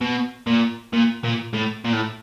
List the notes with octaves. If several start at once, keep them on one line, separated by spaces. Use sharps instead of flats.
B2
A#2
A#2
A#2
A2
A#2
A2